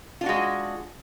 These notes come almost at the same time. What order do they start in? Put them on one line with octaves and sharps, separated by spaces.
F4 D4 F#4 G#3